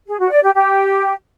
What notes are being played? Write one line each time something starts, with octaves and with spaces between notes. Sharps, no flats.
G#4
F#4
D5
G4
G4